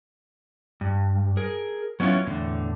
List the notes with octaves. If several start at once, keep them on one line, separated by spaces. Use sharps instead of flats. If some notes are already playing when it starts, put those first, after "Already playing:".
G2
G#4 A#4
F#3 B3 C#4 E4 F4
E2 A2 D3